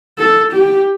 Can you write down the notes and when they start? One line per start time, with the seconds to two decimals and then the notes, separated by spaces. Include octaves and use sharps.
0.18 A4
0.52 G4